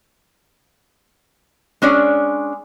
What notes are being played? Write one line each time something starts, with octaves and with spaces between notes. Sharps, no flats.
G#3 C#4 D4 C#5